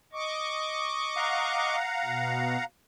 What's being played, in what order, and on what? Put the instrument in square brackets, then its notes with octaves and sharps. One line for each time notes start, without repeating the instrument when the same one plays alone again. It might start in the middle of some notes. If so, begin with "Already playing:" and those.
[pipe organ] D#5 C#6 D6
[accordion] F5 F#5 A#5
[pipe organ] B2